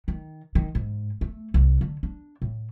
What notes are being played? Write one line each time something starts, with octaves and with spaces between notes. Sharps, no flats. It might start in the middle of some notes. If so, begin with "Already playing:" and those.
D#3
D#3
G#2
A3
C2
D3
D4
A2